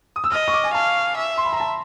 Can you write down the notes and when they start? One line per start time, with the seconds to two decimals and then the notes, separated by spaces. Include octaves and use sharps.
0.16 D#6
0.24 E6
0.31 D#5 F6
0.48 C#6
0.54 D6
0.64 G#5
0.74 F5 A5
1.17 E5
1.38 C6
1.45 B5
1.52 A#5
1.60 A5